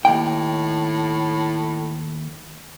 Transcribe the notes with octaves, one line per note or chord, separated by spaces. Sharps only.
D#2 A2 G5